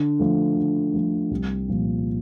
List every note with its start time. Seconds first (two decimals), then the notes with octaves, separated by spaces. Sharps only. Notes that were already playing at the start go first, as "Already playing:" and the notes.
Already playing: D3
0.19 F3 A3
0.57 D3
0.94 F3 A3
1.31 C2
1.68 A#2 F3